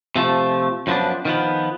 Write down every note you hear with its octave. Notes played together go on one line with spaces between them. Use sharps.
C3 F3 A3
F#2 F3 B3 D4
D#3 F3 B3